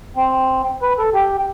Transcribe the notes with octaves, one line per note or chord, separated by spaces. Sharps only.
C4
B4
A4
G4